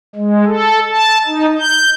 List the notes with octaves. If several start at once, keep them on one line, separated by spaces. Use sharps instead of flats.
G#3
A4
A5
D#4
G6